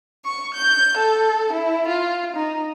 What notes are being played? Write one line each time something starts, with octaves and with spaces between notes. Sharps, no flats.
C#6
G6
A4
E4
F4
D#4